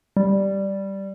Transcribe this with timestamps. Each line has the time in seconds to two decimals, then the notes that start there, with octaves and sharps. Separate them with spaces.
0.17 G3